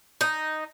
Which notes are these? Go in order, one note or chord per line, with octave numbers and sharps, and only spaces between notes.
D#4